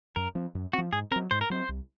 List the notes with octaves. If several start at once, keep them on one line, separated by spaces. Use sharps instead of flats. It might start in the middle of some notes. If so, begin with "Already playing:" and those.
F#2 A#4
F3 C4
F#2
F3 C4 F#4
G#2 G#4
F#3 C4 A#4
G#2 C5
A#4
F#3 C4 C5
C2